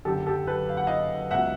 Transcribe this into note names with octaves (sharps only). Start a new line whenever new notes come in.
F#1 F#2 D3 G4 A4
G4 A4
A4 B4
F5
F#5
D#5 F5
C#2 B2 E5 F#5